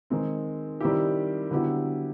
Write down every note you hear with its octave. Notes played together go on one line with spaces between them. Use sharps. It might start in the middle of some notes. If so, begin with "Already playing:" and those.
D#3 G#3 C4
D#3 G3 C4 E4 G4
D3 F#3 B3 E4 G4